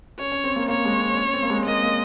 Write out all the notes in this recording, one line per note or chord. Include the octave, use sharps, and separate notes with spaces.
C#4 C#5
C#4
C4
A#3
A#3 C#5
G#3
C4
C#4
C4
A#3
G#3
A#3 D#5
A#3